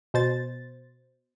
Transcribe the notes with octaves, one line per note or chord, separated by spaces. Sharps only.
B2 C5 A6